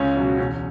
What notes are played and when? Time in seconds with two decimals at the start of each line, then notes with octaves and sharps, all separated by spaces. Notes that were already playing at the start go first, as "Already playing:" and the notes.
Already playing: C#2 C#4
0.17 B2 F#3
0.38 E1 C#4